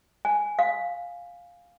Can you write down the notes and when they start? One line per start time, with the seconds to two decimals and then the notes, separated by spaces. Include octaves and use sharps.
0.25 G#5
0.59 F5